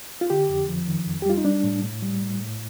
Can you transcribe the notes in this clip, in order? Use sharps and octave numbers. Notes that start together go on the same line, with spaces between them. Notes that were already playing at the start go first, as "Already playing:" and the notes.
F4
D3 G4
F2
F3
D#3
F2
G4
G3 F4
D#4
G3 D4
A2
A2
G3
A2
A2